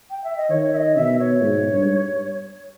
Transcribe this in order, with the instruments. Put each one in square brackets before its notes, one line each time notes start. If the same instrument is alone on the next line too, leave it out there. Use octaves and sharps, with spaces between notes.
[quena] G5
E5
D#5
[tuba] D#3 [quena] C#5
[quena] E5
D#5
[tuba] B2 [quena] E5
[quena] C#5
[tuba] G#2
G2